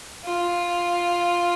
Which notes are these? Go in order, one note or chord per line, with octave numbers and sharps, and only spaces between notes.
F4